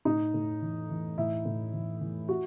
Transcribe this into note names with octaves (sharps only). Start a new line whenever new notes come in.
A2 D#4
A2
E3
E3
A2 E4
A2
E3
E3
F#4